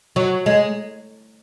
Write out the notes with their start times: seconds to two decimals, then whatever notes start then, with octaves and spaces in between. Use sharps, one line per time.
0.16 F#3
0.46 G#3